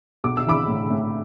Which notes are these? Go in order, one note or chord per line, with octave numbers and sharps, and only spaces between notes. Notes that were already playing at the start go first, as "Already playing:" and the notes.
B1 D6
E6
E3 B5 D6
A2
A2